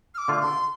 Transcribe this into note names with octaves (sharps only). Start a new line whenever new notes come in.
F6
D6
D3 A3 F4
C6